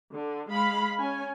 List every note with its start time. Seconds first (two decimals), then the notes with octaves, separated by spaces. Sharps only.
0.13 D3
0.50 G#3 F5 B5
0.99 C#4 G#5